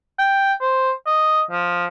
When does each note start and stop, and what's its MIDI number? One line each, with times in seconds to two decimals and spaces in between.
0.19 0.53 79
0.61 0.91 72
1.06 1.41 75
1.51 1.86 53